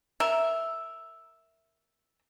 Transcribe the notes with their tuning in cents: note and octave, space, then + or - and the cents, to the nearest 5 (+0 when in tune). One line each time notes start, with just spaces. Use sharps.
A#4 +0 E5 +0